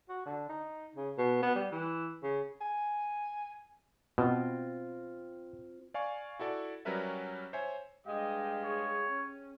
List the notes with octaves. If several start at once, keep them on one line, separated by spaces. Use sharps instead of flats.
F#4
D3
D#4
C#3
B2
B3
G3
E3
C#3
G#5
B2 C4 F4
D5 F5 G#5 C#6
E4 F#4 A4 D5
F#3 G3 C#4 A#4 B4 E5
C5 C#5 E5 G#5
G2 G#3 G4 D#5 F5
G#4 C#5
C#4